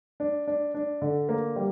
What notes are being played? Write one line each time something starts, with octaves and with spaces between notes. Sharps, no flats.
D4
D4
D4
D3
A#3
G3